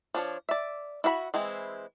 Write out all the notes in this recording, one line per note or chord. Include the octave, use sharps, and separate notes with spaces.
F3 D4 C#5
D5 E5
E4 F#4 E5 B5
E3 G#3 C4 E4